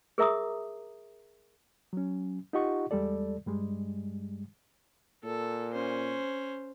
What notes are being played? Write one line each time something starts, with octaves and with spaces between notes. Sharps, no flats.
G#4 A#4 E5 A#5 D6 D#6
F#3 C#4
D#4 F4 G4 D#5 F#5 C#6
E2 G3 G#3 A4 D5
G2 G3 G#3
A#2 A4
C#4 C5